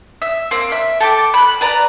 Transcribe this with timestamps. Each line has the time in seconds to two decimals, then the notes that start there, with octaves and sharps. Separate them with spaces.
0.22 E5
0.51 A#3 C4
0.72 E5
1.00 A4 G5 D6
1.34 B5 F#6
1.61 B4 D5 A#5